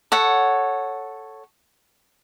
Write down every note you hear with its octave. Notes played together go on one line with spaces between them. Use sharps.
A4 C#5 F#5